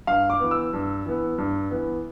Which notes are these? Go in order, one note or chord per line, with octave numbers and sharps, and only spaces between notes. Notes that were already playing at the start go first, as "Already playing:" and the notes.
G2 F5
D6
E3 B3
E6
G2
E3 B3
G2
E3 B3